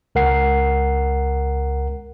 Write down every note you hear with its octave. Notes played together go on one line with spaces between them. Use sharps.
C#2 A#4 F#5 C7